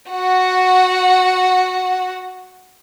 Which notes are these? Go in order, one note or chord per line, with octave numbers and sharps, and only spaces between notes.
F#4 F#5